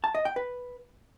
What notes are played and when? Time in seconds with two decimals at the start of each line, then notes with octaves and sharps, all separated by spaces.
0.04 A5
0.15 D#5
0.25 G5
0.36 B4